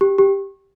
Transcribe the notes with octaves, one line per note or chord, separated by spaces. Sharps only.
G4
G4